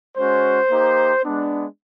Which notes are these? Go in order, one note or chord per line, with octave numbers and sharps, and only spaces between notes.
G#3 C#4 F#4 C5
A#3 D#4 G4
G#3 B3 D4